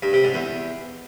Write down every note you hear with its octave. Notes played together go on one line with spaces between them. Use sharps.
G2
C3
G#2
E2